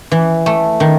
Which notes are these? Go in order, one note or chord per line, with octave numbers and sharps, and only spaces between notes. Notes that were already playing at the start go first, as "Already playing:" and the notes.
E3
A3
D#3